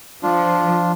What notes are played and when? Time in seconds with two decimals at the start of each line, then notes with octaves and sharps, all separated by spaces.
0.23 F3 D4 F4